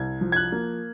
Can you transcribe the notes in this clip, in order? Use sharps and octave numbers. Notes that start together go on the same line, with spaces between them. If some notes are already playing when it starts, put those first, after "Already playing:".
Already playing: C2 G#6
F3
G#6
F#6
A#3